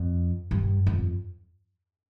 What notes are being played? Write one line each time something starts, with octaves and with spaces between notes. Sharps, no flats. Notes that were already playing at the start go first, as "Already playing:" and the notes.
Already playing: F2
G2
F2